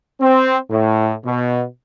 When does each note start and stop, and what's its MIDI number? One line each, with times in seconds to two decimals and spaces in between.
0.21 0.56 60
0.71 1.13 45
1.24 1.64 47